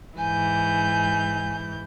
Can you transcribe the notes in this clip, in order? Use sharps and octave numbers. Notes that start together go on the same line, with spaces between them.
G#2 E3 G#5 G6